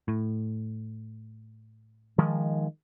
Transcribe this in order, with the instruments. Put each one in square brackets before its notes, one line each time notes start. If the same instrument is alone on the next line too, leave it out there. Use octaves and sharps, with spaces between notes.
[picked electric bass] A2
[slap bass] D#3 F3 G#3